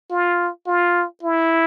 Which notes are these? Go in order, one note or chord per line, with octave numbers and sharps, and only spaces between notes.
F4
F4
E4